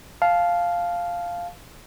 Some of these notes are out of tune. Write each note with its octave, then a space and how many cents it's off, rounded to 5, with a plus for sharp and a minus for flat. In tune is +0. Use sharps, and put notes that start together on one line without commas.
F5 +0 A5 -25